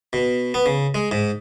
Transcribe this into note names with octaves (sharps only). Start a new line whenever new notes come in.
B2
B3
C#3
G#3
G#2